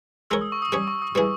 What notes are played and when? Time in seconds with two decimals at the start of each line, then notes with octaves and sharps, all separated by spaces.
0.30 G#3 D#4 A#4 C#5 E6
0.41 D#6
0.52 C#6
0.62 D#6
0.72 G3 C#4 G4 C#5 D#6
0.87 C#6
1.02 D#6
1.15 G3 B3 E4 G#4